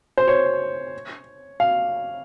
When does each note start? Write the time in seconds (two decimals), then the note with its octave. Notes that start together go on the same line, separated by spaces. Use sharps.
0.17 C5
0.28 C#5
1.60 F5